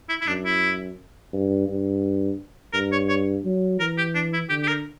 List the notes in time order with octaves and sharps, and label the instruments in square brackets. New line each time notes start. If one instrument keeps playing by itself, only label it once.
[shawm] E4
E4
[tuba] F#2 [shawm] D4
[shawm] E4
[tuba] G2
G2
[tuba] G2 [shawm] A#4
[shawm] C#5
C#5
[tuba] F#3
[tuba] E3 [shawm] A#4
[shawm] G4
D4
E4
[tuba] D3 [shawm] G4
[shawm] G4
A#4